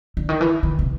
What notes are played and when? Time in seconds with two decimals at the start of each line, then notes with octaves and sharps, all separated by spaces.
0.17 D3
0.29 D#3
0.41 E3
0.63 D#3
0.79 C3